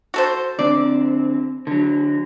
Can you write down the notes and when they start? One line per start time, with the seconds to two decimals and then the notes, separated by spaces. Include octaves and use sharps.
0.14 F#4 A4 C5
0.59 D3 C4 D5
1.67 D3 F#3